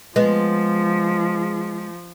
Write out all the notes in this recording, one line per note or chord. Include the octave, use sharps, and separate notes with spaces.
F3 G#3 B3